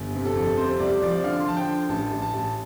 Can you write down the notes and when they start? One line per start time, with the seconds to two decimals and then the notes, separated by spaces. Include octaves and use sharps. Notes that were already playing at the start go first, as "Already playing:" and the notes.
Already playing: G1
0.15 C3
0.26 A4
0.36 F2
0.57 C3 C5
0.79 C2 D5
1.02 F3 D5
1.24 D3 F5
1.39 C6
1.45 F3 A5
1.57 G5
1.67 D3
1.89 A1 A5
2.11 A1
2.22 A5
2.34 A1